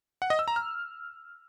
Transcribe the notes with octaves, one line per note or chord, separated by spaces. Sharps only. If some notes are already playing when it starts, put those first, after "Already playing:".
F#5
D#5
E6
A#5
F6